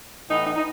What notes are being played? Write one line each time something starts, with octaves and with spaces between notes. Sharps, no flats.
A2 E3 B3 D#4
D#4
D#4